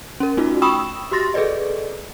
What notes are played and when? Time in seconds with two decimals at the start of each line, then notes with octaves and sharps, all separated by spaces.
0.20 C#4 A#4
0.37 A3 C#4 D#4 F4 F#4
0.62 G5 B5 C#6 D#6 E6 E7
1.11 F#4 G4 C6 A6 A#6
1.34 G#4 A4 B4 D5 D#5